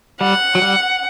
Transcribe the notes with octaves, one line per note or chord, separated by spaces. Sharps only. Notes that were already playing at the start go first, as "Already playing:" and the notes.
G3 F#5
F#3
G3